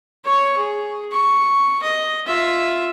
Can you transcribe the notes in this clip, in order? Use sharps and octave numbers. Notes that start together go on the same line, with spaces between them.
C#5 C#6
G#4
C#6
D#5
F4 E5